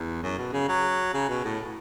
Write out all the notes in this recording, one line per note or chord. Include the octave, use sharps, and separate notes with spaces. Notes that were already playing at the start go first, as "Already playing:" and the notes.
Already playing: E2
F#2
B2
C#3
F#3
C#3
B2
A2